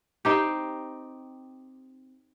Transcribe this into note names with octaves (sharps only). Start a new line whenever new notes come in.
C4 D#4 G4